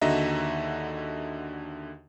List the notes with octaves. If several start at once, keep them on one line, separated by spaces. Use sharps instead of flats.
D#2 D3 F#4 D#5 E5 A#5